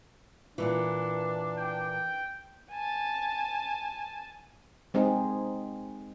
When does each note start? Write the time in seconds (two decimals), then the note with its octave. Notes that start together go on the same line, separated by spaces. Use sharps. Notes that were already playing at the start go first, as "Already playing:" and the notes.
0.58 A#2 E3 D4
1.57 G5
2.71 G#5 A5
4.94 G#3 C4 D#4 G#4